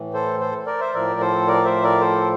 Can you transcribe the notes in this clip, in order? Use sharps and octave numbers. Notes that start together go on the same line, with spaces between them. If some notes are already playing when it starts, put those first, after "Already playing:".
Already playing: A2 E3
A4 C5
A4 C5
A#4 D5
C5 E5
A2 F3 A#4 D5
A4 C5
A#4 D5
C5 E5
A#4 D5
A4 C5